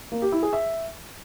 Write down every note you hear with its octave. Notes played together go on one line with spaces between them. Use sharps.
A#3
G4
E4
G#4
E5